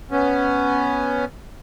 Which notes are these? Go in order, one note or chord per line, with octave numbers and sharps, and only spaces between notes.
B3 C#4